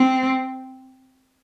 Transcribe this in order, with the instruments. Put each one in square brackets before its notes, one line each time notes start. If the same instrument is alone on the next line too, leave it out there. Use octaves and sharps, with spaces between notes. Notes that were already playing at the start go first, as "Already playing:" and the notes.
Already playing: [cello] C4